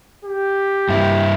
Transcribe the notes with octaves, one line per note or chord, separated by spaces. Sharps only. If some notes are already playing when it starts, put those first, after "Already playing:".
G4
G2 E4